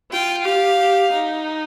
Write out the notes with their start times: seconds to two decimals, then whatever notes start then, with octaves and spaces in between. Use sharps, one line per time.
0.12 F4 G5
0.45 G4 F5
0.79 G4
1.13 D#4